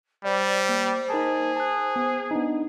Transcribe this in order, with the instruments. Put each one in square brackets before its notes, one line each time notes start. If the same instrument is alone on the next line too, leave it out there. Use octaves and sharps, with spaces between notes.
[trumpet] G3 [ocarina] C5 [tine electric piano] D5
[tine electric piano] A#3
[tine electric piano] D#4 A#4 A5 [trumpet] G#4
[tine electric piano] A5 F#6
B3
B3 D4 D#4